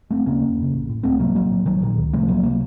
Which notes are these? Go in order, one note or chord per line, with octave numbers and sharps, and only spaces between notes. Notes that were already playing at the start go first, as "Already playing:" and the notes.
F1 A3 C4
D#2 C#3 A#3 C#4
F1
F2 C#3
A1
A2
C#2 A3 C4
C3 F#3 A#3
A1 F#3 A#3
A2
A#1 D#3 F#3
A#2 D#3
C#2
C3 F3 A3
C#2 F#3 A#3
C3 F#3 A#3